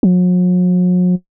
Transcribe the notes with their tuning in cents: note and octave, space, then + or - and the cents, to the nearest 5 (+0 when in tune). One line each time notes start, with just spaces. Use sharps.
F#3 -45